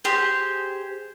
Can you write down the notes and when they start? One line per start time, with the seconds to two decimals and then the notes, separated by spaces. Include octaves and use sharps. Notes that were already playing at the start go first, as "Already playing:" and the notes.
0.04 G4 G#4 C5